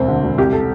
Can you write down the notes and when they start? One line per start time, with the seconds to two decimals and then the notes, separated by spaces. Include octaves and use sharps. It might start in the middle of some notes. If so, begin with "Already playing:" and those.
Already playing: E1 D2 C4
0.08 D3
0.23 E1
0.38 C2 G4
0.53 A4